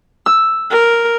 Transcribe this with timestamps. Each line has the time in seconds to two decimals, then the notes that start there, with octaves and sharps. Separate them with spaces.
0.26 E6
0.71 A#4